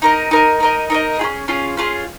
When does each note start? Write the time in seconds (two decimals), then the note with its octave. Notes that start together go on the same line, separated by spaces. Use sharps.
0.02 D#4 A#4 D#5
0.31 D#4 A#4 D#5
0.60 D#4 A#4 D#5
0.90 D#4 A#4 D#5
1.19 F4 G#4
1.24 C#4
1.48 C#4 F4 G#4
1.77 C#4 F4 G#4